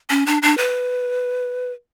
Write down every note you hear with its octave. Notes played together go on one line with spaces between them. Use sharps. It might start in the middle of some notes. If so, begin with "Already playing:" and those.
C#4
D4
D4
B4